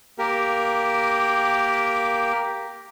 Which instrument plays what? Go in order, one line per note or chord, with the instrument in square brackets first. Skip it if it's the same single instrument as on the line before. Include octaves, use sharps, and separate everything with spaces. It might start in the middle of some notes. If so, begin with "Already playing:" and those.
[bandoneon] A#3 G4 A#4